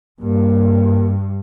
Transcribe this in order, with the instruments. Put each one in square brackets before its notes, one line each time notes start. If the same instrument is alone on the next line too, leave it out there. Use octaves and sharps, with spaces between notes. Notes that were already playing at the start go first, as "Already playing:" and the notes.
[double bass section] G2 [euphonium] A#3